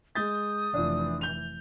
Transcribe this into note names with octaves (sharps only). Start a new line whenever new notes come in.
G#3 D#6 G6 A6
F1 E3 D4 F4
G6 F7